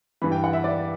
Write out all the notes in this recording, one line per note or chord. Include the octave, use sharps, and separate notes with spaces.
G2 E3 B5
G5
F#5
E5
D5